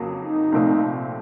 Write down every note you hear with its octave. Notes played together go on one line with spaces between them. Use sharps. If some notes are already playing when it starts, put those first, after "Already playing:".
Already playing: F2 C#3 F#3 A#3
D#4
C2 A#2 F3 A3 C4